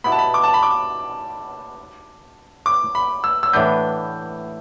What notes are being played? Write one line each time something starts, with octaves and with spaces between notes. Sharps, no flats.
B2 B3 E4 G4 B5
A5
B5
D6
A5
B5
D6
D6
B5
E6
E6
A2 E3 B3 D4 B4 G6